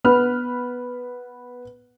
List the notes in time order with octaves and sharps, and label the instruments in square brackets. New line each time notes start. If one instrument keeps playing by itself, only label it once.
[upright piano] B3 B4 F6